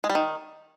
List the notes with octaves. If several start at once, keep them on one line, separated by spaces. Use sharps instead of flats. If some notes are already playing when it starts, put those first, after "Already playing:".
G#3
G3
D#3